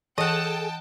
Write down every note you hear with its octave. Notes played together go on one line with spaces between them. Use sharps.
E3 G#4 A4 D#5 F#5 G5 A5